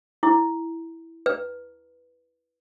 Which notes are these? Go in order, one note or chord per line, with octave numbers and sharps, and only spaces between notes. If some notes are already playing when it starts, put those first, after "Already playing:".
E4
B4